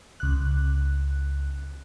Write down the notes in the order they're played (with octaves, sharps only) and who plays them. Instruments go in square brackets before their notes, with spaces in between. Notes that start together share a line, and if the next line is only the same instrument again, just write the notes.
[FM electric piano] C#2 F#6